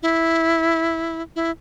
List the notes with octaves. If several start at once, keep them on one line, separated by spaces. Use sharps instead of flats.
E4
E4